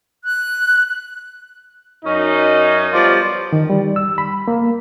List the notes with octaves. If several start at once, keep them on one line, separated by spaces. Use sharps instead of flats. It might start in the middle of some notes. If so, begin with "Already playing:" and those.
F#6
F#2 C#4 D#4
F3 G3 B3 F4 D5
D#3
G3
E6
B5
A#3